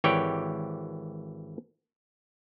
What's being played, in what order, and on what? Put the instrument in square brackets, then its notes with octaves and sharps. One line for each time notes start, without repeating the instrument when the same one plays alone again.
[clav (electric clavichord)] G#1 E3 G4 C#5 D5 G5